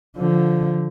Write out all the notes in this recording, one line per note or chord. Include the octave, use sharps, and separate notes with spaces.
D3 F3